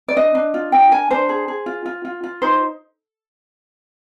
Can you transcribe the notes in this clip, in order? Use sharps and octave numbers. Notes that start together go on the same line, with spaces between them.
D5
D4 D#5
D4
F4
D4 G5
A#4 G#5
D4 C5
G#4
G#4
F4
F4
F4
F4
D#4 C5